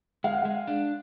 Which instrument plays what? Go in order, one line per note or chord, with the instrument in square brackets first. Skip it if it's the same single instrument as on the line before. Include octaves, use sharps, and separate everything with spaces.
[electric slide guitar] G#3 [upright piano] F5
[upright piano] F#5
[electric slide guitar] G#3 [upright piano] F5
[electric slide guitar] D4